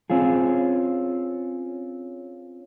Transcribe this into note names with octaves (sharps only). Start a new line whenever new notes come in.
C4 C#4 F4 G#4